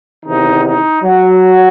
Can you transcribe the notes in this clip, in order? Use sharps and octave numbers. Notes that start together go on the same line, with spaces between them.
E2 C3 D#3 D#4
D#4
F#3